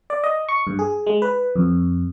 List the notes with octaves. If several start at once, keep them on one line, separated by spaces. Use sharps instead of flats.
D5
D#5
C#6
G2
G#4
G#3
B4
F2